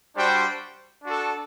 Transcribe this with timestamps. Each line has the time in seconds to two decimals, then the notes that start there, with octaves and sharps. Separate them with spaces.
0.16 G3 D4 F#4 C5 G5
1.04 D4 F#4 A4